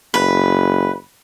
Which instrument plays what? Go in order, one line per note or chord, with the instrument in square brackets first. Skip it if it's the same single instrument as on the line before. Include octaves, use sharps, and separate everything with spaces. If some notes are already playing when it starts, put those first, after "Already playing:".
[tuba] F#1 [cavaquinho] B4